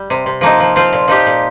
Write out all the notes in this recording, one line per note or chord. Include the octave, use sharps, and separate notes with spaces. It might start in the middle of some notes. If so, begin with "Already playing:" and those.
Already playing: G3
C3
C3
F3 A#3 D#4
F3
F3 C4 F4
A#2
F3 D#4 G4
A#2